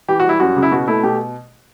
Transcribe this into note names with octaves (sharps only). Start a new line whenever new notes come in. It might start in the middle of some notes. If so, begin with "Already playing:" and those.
E3 G4
F#4
G3 E4
F#2 F#4
C#3
E4
B2 F#4
A3 E4
B2 G4